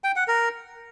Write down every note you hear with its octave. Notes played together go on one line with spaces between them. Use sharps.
G5
F#5
A#4